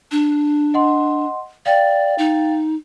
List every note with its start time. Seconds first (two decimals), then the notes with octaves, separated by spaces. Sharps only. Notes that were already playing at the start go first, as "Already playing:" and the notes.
0.11 D4
0.74 D#5 F#5 C6
1.66 D5 F5 G5 A6
2.18 D#4